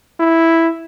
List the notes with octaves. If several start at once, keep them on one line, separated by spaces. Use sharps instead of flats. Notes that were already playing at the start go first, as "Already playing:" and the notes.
E4